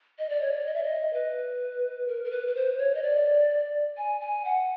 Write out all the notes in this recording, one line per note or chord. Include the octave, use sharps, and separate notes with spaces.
D#5
D5
C#5
D5
D#5
E5
D#5
B4
A#4
A#4
B4
B4
C5
C#5
D#5
D5
G#5
G#5
F#5